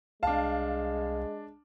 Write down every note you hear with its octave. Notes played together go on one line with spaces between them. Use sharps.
C2 G#3 D4 F5 A5